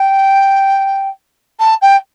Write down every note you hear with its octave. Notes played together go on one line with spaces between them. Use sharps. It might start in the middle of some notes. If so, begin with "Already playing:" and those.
Already playing: G5
A5
G5